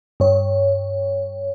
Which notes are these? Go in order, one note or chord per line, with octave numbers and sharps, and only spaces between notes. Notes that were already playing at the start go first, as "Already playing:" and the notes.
G2 C#5